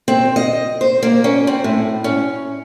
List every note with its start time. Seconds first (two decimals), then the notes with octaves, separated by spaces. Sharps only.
0.08 C4
0.36 D#5
0.81 C5
1.03 A#3
1.24 C#4
1.47 C4
1.64 A2
2.04 C#4